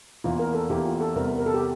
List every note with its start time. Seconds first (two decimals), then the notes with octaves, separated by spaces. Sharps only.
0.24 E2 E3 A#3 F4
0.39 A#4
0.54 A4
0.70 E2 E3 A#3 G4
0.85 F4
1.01 A4
1.16 E2 C3 G3 A#4
1.38 A#4
1.46 A4
1.54 G4